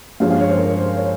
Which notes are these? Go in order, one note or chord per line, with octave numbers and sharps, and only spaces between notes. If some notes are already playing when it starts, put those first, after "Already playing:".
G2 F3 G#3 C#4 F5
F5
C#5
C5
A#4
C5
C#5